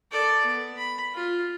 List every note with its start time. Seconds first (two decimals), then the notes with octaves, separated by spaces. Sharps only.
0.12 A4 D5
0.45 B3
0.78 B5
1.14 F4